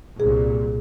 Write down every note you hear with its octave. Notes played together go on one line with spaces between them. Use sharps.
C2 A#2 G#4